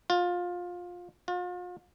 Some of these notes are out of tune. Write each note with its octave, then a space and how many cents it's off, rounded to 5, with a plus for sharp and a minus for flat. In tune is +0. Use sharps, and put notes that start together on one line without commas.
F4 +20
F4 +40